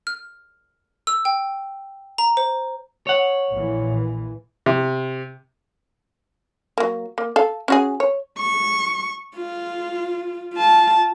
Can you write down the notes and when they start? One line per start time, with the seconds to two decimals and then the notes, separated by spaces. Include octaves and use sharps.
0.07 F6
1.07 E6
1.25 G5
2.18 A#5
2.37 C5
3.07 C#5 F#5
3.50 A#1 A#2 E3
4.66 C3
6.78 F#3 A#3
7.18 A#3
7.36 A4 F5
7.68 C#4 F#4 G#4
8.00 C#5
8.39 C#6
9.36 F4
10.54 F4 A5